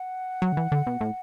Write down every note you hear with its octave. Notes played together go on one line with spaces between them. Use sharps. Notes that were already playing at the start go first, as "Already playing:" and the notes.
Already playing: F#5
F#3
D3
E3
D3
B2
A2